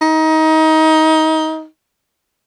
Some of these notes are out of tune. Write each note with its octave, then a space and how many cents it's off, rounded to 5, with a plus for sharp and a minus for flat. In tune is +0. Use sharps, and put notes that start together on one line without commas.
D#4 +25